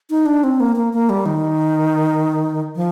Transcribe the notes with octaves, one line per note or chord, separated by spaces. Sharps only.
D#4
D4
C4
A#3
A#3
A#3
G3
D#3
F3